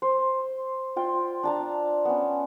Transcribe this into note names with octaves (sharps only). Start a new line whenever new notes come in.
C5
F4 G5
D4 A5 A#5
B3 C#4